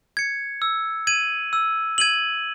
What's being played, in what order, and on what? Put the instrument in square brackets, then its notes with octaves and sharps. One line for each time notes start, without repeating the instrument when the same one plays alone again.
[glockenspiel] G#6 C#7
E6
G#6 D#7 F#7
E6
G#6 D#7 F#7